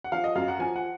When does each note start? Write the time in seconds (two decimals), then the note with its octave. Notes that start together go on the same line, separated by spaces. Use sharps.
0.04 F#5
0.12 F3 F5
0.24 D#5
0.35 F#2 F5
0.48 F#5
0.59 F3 G#5
0.76 F#5